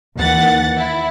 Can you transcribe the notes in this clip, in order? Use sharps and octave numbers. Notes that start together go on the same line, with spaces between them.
D#2 E3 F#5 A6
E4